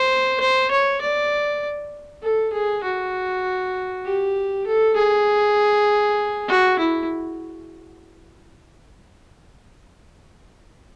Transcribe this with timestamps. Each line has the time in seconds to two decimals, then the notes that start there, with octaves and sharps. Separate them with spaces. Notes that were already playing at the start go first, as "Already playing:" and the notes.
Already playing: C5
0.40 C5
0.71 C#5
1.01 D5
2.23 A4
2.53 G#4
2.84 F#4
4.05 G4
4.67 A4
4.96 G#4
6.48 F#4
6.79 E4